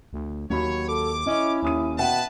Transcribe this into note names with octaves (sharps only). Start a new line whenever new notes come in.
D2
D#2 F#3 C#5 B5
A4 D6
C#4 E4 D#5
D#2 C#4 D#6 D#7
B2 B4 E5 F#5 G5 A5